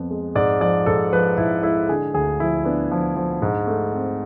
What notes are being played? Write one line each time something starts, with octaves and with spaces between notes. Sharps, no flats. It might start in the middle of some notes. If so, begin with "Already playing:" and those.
Already playing: F2 B3
G#3
G#2 D5
F3 D5
G#2 A4
F3 B4
G#2 E4
G#3 E4
D3 G#4
D2 G#4
F3 E4
B3 D4
F3
F3
G#2
A3
C4